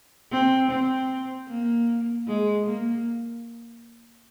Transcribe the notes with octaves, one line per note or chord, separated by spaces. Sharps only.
C4
C4
A#3
G#3
A#3